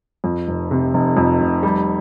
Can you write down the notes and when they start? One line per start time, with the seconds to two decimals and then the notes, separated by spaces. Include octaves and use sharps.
0.24 F2
0.47 F1
0.71 C3
0.94 F1
1.17 F2
1.40 F1
1.63 G3